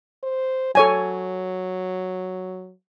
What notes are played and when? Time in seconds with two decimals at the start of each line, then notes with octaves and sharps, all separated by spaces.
0.23 C5
0.75 F#3 A4 C#5 G#5